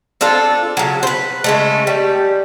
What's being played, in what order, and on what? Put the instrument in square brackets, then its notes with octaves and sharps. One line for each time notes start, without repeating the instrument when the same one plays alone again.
[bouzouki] C4 D4 F4 A4
C#3 F#3
B4 C5
C#3 G#3 A3
G3